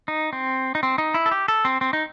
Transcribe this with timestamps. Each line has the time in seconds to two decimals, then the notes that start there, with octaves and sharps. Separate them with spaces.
0.08 D#4
0.33 C4
0.75 D#4
0.83 C4
0.98 D#4
1.14 E4
1.26 A4
1.31 G4
1.48 A4
1.65 C4
1.81 C4
1.93 D#4